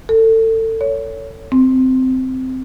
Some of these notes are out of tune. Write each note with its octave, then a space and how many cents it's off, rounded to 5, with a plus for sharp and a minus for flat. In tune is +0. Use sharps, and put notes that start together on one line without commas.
A4 +30
C#5 +25
C4 -15